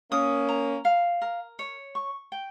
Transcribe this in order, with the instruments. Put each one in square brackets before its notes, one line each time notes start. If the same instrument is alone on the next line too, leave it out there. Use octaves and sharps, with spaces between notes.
[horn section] A#3 C#4 [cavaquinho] D#6
[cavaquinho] A#5
F5
A#4
C#5
C#6
G5